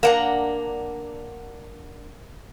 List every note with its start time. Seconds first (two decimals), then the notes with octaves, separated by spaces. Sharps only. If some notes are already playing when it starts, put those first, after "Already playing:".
0.03 A#3 D4 F#5 A#5